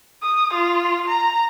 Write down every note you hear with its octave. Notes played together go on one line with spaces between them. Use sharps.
D#6
F4
A#5